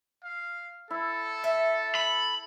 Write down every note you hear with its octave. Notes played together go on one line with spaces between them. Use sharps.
F5
E4 A4
E5
B5